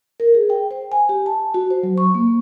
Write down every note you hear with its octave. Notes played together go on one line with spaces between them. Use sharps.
A#4
G#4
G5
C5
G#5
G4
A5
F#4
C5
F#3
C#6
A#3